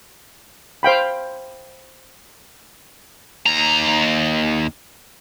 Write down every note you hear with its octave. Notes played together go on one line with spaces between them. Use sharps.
C5 F5 G5 B5
D#2 A#5